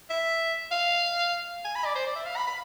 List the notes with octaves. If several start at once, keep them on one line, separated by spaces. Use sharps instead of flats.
E5
F5
G#5
B5
D5
C5
D5
E5
F5
B5
B5